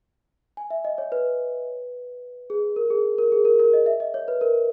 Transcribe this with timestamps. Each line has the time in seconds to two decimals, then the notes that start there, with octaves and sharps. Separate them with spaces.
0.57 G#5
0.70 E5
0.85 D#5
0.98 C#5
1.12 B4
2.50 G#4
2.76 A#4
2.90 G#4
3.18 A#4
3.32 G#4
3.45 A#4
3.59 A#4
3.73 D#5
3.86 E5
4.00 D#5
4.14 C#5
4.28 B4
4.41 A#4